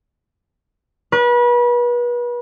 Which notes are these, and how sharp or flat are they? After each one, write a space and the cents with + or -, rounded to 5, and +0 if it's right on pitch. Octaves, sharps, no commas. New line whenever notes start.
B4 -35